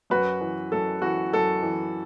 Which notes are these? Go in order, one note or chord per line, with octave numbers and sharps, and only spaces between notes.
F#2 F#4 B4
E3
F#2 A4
E3 F#4
F#2 A4
E3